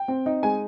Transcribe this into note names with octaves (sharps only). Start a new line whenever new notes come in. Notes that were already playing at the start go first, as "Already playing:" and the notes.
Already playing: G5
C4
D#4
G#3 G#5